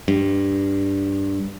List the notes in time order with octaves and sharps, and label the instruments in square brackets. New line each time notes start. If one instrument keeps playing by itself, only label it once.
[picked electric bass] G2